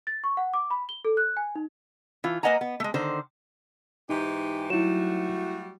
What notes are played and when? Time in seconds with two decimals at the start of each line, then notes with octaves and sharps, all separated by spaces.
0.07 A6
0.24 C#6
0.37 F#5
0.54 D6
0.70 B5
0.89 G7
1.05 A4
1.17 F#6
1.37 G#5
1.55 D#4
2.24 E3 F4
2.43 A#3 B4 D#5 F#5 G#5 A#5
2.61 B3
2.80 G#3 A3
2.94 D3 D#3 C5
4.09 G#2 E3 D#4 G4
4.70 F#3 G3 A3 E4 F#4 E7